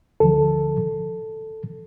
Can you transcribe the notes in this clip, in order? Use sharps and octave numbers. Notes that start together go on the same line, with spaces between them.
D2 D3 F3 A4